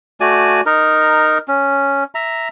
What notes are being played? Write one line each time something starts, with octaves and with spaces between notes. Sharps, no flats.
A3 F#4 D5 G#5
D#4 A#4
C#4
E5 A#5